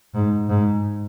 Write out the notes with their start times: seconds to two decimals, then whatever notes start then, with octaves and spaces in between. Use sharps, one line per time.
0.15 G#2
0.49 G#2